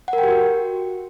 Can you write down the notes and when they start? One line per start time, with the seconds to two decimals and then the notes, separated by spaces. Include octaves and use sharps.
0.08 F#5
0.13 A#4
0.18 G5
0.23 G4
0.28 F#4